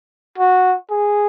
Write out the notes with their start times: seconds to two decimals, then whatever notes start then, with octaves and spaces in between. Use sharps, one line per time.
0.38 F#4
0.91 G#4